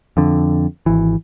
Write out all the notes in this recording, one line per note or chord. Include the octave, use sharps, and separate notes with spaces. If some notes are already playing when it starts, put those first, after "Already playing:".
F2 D3
G#1 E3